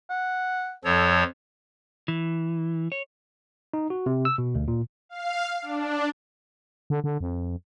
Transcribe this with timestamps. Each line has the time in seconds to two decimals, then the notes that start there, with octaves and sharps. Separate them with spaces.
0.10 F#5
0.84 F2 F3 A4 C#5
2.08 E3
2.92 C#5
3.74 D#4
3.90 F#4
4.06 C3
4.25 E6
4.38 B2
4.55 D2
4.68 A#2
5.09 F5
5.62 D4
6.90 D3
7.04 D3
7.21 F2